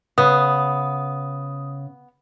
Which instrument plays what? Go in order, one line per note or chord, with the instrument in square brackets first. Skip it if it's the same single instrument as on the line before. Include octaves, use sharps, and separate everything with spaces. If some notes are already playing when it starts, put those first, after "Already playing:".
[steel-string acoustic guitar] C#3 [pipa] B3 [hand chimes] D#6